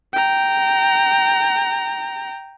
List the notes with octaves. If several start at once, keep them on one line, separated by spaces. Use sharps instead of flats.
G5 A#5